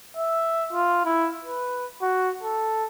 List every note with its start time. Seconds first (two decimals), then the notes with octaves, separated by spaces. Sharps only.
0.17 E5
0.73 F4
1.05 E4
1.45 B4
2.02 F#4
2.43 A4